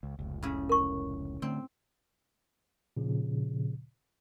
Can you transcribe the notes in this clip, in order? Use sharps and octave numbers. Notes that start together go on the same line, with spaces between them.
C#2
F1 C#2
A2 C#3
A#4 C#6
D3 A3 C4
A#2 C#3 F3